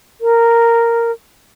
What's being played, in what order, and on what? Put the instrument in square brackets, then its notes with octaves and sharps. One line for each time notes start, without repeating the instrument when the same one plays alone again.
[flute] A#4